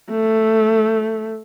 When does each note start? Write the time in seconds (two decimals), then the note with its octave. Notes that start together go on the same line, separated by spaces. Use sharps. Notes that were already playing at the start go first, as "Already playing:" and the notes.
0.11 A3